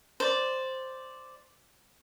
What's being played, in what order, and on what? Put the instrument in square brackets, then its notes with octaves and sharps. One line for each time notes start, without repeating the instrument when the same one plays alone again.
[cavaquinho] C5 D5